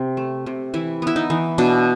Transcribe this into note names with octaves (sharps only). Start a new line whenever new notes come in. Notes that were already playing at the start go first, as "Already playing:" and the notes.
Already playing: C3
A3
C3
E3 E4
B3 E4
D#4
E3
B2 D4